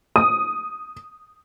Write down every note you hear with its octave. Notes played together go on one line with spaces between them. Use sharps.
D#6